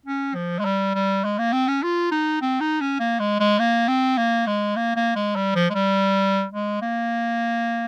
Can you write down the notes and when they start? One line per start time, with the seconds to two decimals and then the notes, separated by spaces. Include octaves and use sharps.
0.06 C#4
0.35 F3
0.59 G#3
0.65 G3
0.95 G3
1.24 G#3
1.38 A#3
1.52 C4
1.68 C#4
1.83 F4
2.11 D#4
2.41 C4
2.60 D#4
2.81 C#4
3.00 A#3
3.20 G#3
3.40 G#3
3.59 A#3
3.88 C4
4.17 A#3
4.46 G#3
4.76 A#3
4.96 A#3
5.16 G#3
5.36 G3
5.55 F3
5.70 G#3
5.74 G3
6.52 G#3
6.82 A#3